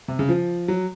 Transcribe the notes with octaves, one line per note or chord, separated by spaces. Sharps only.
C3
C#3
F3
F#3